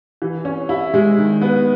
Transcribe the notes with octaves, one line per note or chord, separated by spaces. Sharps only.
E3
C#4
E4
G#3
D#3
B3